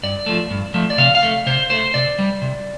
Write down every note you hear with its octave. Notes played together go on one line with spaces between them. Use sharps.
G2 D5
F3 A3
G2
F3 A3
D5
C3 F5
F5
A3
C3 C5
A3 C5
C3 D5
G3
C3